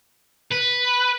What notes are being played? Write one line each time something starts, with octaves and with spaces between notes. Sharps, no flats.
B4